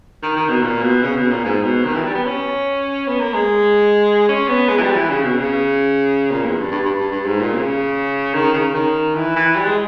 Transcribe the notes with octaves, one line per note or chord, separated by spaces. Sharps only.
D#3
D#3
B2
A#2
B2
C#3
B2
A#2
G#2
B2
D#3
E3
G3
B3
C#4
B3
A#3
G#3
C#4
B3
G#3
E3
G3
E3
C#3
B2
C#3
A#2
E2
G2
G2
G2
G2
G2
G#2
A#2
C#3
D#3
C#3
D#3
E3
E3
G3
G#3